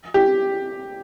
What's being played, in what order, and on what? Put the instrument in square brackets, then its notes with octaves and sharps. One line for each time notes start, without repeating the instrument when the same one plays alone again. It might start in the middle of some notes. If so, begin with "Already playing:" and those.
[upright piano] G4